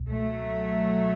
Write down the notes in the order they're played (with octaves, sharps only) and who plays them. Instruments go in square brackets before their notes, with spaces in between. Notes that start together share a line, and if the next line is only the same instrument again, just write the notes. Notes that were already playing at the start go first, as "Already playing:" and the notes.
Already playing: [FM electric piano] C#2 B2
[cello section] F#3 A3